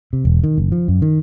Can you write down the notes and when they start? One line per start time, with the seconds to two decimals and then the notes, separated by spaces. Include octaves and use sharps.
0.13 C3
0.25 E1
0.44 D#3
0.58 F#1
0.72 F3
0.88 F#2
1.02 D#3